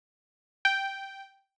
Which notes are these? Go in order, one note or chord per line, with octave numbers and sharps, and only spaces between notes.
G5